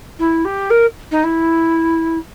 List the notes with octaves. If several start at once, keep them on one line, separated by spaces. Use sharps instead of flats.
E4
G4
A#4
D#4
E4